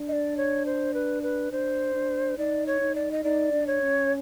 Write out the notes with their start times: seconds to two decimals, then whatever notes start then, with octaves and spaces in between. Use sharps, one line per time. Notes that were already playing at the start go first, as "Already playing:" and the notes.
Already playing: D4
0.08 D#5
0.13 D5
0.37 C#5
0.66 C5
0.94 B4
1.23 B4
1.51 D4 C5
1.95 D4
2.38 D#4 D5
2.67 C#5
2.81 D#4
2.95 D5
3.12 D#5
3.24 D#4 D5
3.52 D4
3.67 C#5
3.81 C#4